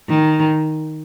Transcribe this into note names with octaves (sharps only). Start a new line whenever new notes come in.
D#3